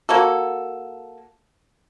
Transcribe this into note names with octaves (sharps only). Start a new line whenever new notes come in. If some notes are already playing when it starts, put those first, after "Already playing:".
A#3 F#4 A4